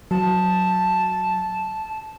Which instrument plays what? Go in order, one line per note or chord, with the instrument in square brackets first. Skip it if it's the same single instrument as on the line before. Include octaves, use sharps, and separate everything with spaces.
[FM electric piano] F#3 [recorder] A5